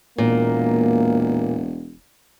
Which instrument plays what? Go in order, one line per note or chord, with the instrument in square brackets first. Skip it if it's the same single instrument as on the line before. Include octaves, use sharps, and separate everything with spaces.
[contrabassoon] E1 [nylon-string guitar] A#2 [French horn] A#3